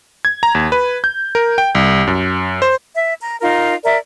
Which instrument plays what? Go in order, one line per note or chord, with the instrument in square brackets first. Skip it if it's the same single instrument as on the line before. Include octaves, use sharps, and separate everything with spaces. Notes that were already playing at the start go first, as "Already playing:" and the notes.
[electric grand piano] G#6
A#5
D#2
B4
G6
A#4
G5
C2
F#2
C5
[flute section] E5
A#5
D#4 F4 A#4
A#4 D5 E5